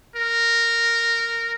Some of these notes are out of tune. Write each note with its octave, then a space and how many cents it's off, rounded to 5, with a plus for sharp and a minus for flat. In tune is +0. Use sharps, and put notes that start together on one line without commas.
A#4 -10